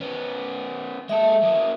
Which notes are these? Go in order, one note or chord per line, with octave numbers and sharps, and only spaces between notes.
B3 C#4
G#3 A4 E5
F#3 A#3